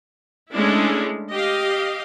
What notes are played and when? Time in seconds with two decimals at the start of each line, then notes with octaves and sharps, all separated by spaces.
0.53 G#3 A3 C#4 D4 E4
1.31 G4 D#5 F5